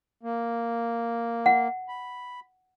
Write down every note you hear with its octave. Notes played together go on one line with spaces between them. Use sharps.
A#3
F#5
B5